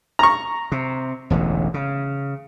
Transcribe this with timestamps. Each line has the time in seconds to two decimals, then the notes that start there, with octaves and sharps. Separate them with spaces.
0.19 A#5 C#6
0.72 C3
1.30 E1 A1 D3
1.74 C#3